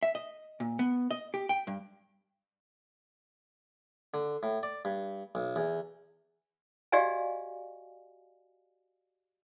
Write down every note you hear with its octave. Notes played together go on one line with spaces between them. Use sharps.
E5
D#5
A#2
B3
D#5
G4
G5
G2
D3
A2
D5
G2
B1
E2
F#4 G4 D5 D#5 F5 G#5